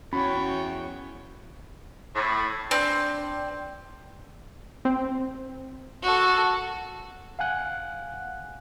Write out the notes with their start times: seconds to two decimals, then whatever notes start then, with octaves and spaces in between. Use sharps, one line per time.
0.13 E2 C#4 F#4 C#5 G5 B5
2.16 A2
2.71 C4 D4
4.85 C4
6.02 F#4 A4
7.39 F5 F#5 G#5 F#6